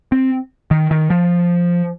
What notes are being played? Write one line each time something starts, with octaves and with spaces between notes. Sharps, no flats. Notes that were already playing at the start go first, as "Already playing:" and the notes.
C4
D#3
D#3
F3